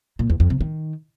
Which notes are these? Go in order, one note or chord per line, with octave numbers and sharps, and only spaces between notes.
A#2
E2
F2
C3
D#3